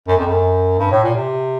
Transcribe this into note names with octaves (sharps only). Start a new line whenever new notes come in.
F#2
F2
F#2
G2
A2
A#2
C3